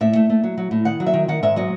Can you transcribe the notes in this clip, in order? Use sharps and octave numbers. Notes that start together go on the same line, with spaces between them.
A2 E5
A3
A3
F#3
F#3
A2
D#3 F#5
F#3
E5
D#3
D#3 F#5
G#2 E5
F#3 D#5